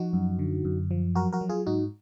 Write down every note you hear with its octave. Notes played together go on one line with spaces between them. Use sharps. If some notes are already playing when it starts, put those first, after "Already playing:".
Already playing: F3 D#4 F#4
F#2
D3
F#2
F3
F#3 F#4 A#4
F#4 A#4
F#3
F4 G#4
G#2 D#4 F#4